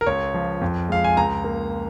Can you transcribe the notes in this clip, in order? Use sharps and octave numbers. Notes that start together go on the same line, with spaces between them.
A#4
C#2 C#5
F3
F2
G#3 F5
G#5
C#2 A#5
A#3